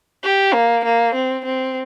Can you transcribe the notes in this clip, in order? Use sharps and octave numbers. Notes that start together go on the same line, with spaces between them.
G4
A#3
A#3
C4
C4